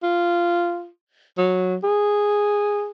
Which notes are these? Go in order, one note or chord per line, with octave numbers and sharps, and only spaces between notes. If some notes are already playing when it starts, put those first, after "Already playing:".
F4
F#3
G#4